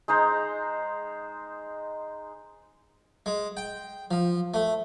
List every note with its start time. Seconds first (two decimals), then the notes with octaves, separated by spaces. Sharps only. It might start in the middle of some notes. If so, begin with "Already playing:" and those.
0.08 G#3 D#4 C5 A#5
3.26 G#3
3.57 G5
4.11 F3
4.54 A3